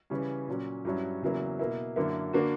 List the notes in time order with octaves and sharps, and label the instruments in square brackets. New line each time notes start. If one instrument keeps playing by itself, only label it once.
[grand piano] C#3 E3 G3 C#4
A#2 F#3 C#4
G2 F#3 C#4 E4
E2 C#3 F#3 A#3 E4
B2 A#3 E4
F#2 D3 A#3 E4
D3 A#3 D4 F#4